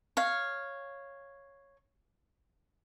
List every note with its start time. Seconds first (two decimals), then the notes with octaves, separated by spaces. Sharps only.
0.17 C#5 F5